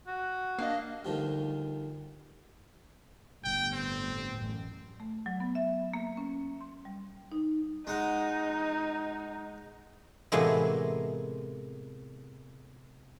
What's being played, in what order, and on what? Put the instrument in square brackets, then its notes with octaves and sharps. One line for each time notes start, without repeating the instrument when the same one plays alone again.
[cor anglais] F#4
[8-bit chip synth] A#3 D4 D#5 [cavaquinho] F5
[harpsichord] D2 D#3 F3 G3
[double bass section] G1 A2 [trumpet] G5
[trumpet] C4
[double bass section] A1 F#2
[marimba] A3
F#3
B3
E5
A#3
C#4
C6
G3
D#4
[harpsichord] G#3 F#5 [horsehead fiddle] D#4
[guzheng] A2 C3 E3 G#3 A#3 B3